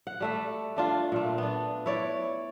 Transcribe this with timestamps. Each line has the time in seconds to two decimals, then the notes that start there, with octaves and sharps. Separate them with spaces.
0.07 F#5
0.20 G3 A3 E5
0.77 A3 D4 F4
1.12 A#2 A3
1.38 B3 D4
1.86 E4 C#5 D5